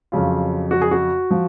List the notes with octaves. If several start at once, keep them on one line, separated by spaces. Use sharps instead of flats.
F2 C#3 F#3 F4
F#4
G#4
F#4
F3